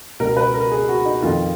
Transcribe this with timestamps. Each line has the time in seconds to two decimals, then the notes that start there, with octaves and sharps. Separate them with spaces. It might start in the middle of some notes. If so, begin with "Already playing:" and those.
0.20 C#2 B2 A#4
0.37 B4
0.54 A#4
0.72 G#4
0.88 F#4
1.06 D#4
1.22 F2 D#3 F4